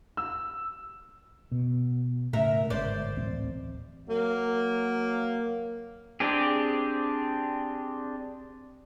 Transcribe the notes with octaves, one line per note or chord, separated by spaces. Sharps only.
E6
B2
A2 C#3 A#4 E5
G1 G#2 C5 D5
D1 A1 C4
F#3 A#3
C4 D4 G4 G#4